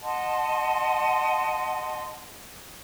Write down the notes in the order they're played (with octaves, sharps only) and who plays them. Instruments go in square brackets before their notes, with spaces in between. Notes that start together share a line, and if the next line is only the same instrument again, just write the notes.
[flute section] D#5 F#5 A5 C6